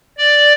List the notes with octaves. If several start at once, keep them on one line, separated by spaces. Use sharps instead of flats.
D5